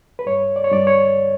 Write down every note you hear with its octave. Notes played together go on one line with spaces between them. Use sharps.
B4
G2 C#5
D5
C#5
G2 D5
C#5